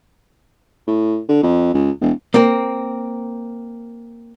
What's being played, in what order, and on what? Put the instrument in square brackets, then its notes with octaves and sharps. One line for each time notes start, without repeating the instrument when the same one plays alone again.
[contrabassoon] A2
D3
F2
C#2
E1
[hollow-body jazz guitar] A#3 C4 A#4